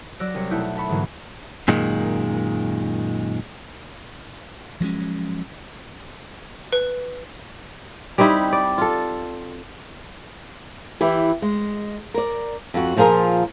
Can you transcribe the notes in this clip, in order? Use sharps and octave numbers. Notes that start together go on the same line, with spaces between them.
F#3 D5 E6 F#6 A#6
C2 C#5
B2 A3 D#4 E4 F#5 G6
A4 E5 B5 C#6
G#2 B2 D3 E3 F#3 A#3
F#2 A#2 D#3 G#3
F3 F#3 G#3 C#4
B4
G3 C4 D#4 E4
D5
F4 A4
E3 E4 G4
G#3
A#4 D5
F2 F#4
A#2 F3 F4 G#4 A#4